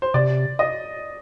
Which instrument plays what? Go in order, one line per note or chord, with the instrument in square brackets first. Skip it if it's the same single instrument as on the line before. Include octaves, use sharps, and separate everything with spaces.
[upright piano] C5
[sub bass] C3 [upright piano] D5
[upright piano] D#5